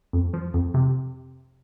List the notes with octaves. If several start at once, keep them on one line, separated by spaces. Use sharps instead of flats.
F2
F3
F2
C3